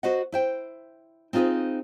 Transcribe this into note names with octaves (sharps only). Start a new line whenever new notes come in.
F#4 B4 C5 D#5 F#5
E4 C5 G5
C4 D#4 F4 G#4 B4 C5